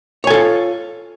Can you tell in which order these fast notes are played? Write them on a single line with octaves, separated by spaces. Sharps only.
C#5 G#5 A4 F4